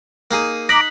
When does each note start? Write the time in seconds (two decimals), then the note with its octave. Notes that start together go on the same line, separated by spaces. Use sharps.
0.31 A#3 D#4 G#4 F6 D#7
0.69 D#4 A#5 D6 F#6 B6 F#7